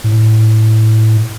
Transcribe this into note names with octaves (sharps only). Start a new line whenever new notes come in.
A2